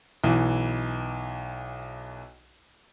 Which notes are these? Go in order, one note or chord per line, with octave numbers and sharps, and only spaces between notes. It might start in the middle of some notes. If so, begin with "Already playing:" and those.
B1 E3